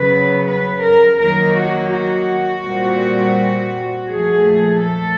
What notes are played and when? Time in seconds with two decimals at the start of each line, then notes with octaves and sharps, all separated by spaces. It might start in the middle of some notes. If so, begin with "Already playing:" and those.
Already playing: C#3 F#3 B3 B4
0.46 B4
0.82 A#4
1.18 D#3 F#3 A#3 D#4 A#4
1.55 F#4
1.90 F#4
2.63 A#2 G3 C4
4.07 A#2 F3 A3 G#4
4.80 A4